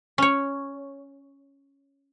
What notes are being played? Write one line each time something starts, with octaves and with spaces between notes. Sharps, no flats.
C#4 C#5